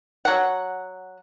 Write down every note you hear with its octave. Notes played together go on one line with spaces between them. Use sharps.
F#3 F#5